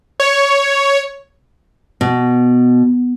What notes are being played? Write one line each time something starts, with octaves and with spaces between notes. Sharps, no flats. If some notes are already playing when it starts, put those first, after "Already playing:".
C#5
B2